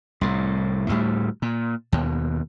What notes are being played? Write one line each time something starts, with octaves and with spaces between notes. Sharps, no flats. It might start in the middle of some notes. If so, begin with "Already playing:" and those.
C2 A2
D2 A2 G3
A#2
D#2 B2